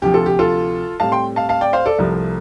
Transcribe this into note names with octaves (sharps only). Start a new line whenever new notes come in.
D2 C3 F3 G4
F4 A4
G4
F4 A4
A2 G3 C4 F5 A5
G5 C6
F5 A5
F5 A5
D5 G5
C5 F5
A4 D5
C2 C3 F3 A3